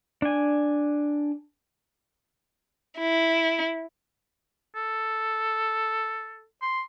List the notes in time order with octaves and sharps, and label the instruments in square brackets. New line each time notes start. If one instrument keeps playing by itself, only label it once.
[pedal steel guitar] D4 G#5
[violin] E4
[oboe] A4
C6